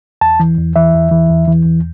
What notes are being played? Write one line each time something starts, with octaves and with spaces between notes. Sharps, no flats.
E2 A5
E3
E2
E3 E5
E2
E3
E2
E3
E2